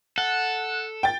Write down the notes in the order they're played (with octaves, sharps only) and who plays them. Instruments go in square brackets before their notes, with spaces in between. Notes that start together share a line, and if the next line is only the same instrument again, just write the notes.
[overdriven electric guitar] A4 [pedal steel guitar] F#5
[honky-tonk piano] G5 A6